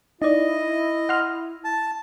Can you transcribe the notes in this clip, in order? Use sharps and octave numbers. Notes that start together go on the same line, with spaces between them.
D#4 E4 D5 D#5
F#5 C6 F6
A5